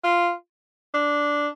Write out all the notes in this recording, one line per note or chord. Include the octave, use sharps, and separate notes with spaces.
F4
D4